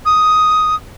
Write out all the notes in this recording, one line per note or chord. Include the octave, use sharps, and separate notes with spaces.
D#6